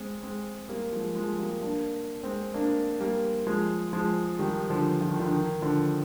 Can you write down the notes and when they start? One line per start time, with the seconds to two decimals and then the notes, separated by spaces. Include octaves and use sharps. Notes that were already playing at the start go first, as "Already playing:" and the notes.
Already playing: G#3 C4
0.23 G#3 C4
0.69 G3 A#3
0.92 F3 G#3
1.15 F3 G#3
1.38 G3 A#3
1.62 A#3 D4
2.23 G#3 C4
2.54 A#3 D4
3.00 G3 A#3
3.47 F3 G#3
3.93 F3 G#3
4.39 D#3 G3
4.70 D3 F3
5.01 F3
5.10 D#3
5.19 D3 F3
5.32 D#3
5.62 D3 F3